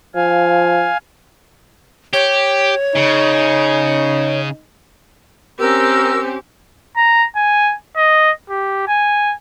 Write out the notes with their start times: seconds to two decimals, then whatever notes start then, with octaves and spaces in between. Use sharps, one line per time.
0.15 F3 F5 G#5
2.13 G4 C#5
2.95 C#3 D#4
5.59 C4 C#4 G4 A#4 E6
6.97 A#5
7.36 G#5
7.97 D#5
8.49 G4
8.88 G#5